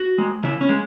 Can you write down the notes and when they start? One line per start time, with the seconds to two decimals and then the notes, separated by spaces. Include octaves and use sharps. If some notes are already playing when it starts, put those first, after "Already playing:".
Already playing: F#4
0.18 G#3
0.44 C#3 E4
0.61 C#4
0.69 G#3